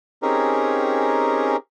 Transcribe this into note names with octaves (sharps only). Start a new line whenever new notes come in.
C4 C#4 D#4 G4 G#4 A#4